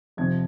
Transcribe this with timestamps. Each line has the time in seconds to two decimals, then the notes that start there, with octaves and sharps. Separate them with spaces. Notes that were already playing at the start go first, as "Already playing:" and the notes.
0.17 F2 C3 F3 G#6